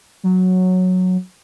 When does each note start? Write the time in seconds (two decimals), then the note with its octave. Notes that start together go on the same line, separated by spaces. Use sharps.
0.24 F#3